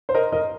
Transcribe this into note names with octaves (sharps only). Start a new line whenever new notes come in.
C5
A#4 D#5
A#4 D#5